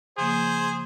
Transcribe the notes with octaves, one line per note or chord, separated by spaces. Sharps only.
C#3 F3 A#3 G#4 C5